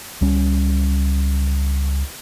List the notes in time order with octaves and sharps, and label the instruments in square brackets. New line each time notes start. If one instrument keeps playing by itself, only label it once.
[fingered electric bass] C#2 G3 C#4